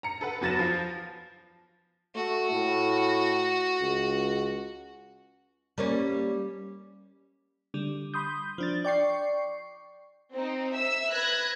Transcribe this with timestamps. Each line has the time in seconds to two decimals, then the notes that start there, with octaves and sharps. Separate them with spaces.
0.03 A#5 C#7
0.21 A4 B4 F#5
0.41 E2 F#3 B4 A6 A#6 E7
0.59 F3 F4
2.15 A3 F#4
2.52 A2
3.81 C#2
5.78 G3 A#3 C#4
7.74 D3 G3
8.14 B5 C6 D#6 G6
8.58 F3 D4 A6
8.85 D5 G5 C#6 C7
10.34 C4 D#4
10.74 E5 E6
11.12 B4 F#6 G#6 A#6